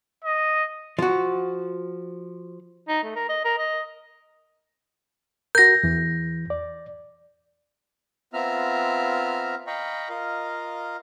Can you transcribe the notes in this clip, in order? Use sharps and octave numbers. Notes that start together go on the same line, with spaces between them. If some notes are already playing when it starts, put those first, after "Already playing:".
D#5
F3 F#4
D#4
A3
A#4
D#5
A#4
D#5
F#4 A#4 G6 A#6
E2 E3
D5
B3 C4 F4 E5 A#5 F6
D#5 F5 G5 A#5 B5 C#6
F4 A#4 D#5 F5